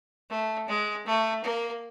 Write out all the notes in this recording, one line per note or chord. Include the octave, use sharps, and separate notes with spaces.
A3
G#3
A3
A#3